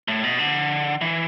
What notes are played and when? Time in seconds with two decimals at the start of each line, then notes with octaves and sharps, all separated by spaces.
0.08 A2
0.24 B2
0.39 D3
1.01 E3